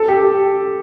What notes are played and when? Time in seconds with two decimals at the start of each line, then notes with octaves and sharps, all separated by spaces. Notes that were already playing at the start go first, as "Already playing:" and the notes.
Already playing: A4
0.08 G4